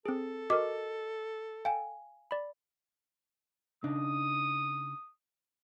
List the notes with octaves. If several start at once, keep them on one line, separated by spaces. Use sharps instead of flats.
C4 G#4 A4
F#4 A#4 D#5 D6
F5 G5 G#5
D5 B5
C#3 D4 D#4 D#6